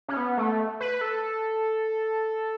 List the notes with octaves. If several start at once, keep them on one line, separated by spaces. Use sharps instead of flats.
C#4
B3
A3
B4
A4